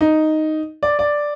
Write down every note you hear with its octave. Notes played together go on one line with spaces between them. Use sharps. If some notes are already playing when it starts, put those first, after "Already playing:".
D#4
D5
D5